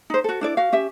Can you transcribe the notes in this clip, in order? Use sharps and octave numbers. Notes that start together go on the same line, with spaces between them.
D#4 C5
F#4 A4
D4 E4 D5
F#4 F5
C#4 G4 E5